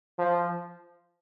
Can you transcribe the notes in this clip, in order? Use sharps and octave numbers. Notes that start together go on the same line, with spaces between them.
F3